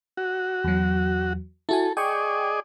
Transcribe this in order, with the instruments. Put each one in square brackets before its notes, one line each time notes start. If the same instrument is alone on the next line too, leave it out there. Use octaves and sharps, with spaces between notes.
[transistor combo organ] F#4
[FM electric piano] E2 F#3
[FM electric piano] E4 F#4 G#5 [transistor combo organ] A4
[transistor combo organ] G#4 D5 D#5 [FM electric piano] G5 C#6